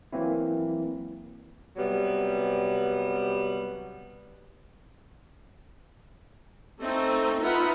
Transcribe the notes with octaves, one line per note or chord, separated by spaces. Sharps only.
E3 F#3 A#3 C4 E4
C3 F#3 G3 B3
A3 C4 D#4
D#4 F4 B4 E5 F#5 B5